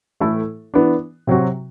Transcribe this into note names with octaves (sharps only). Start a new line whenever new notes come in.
A2 E3 A3 E4 A4
E3 B3 D4
C3 F#3 C4 F#4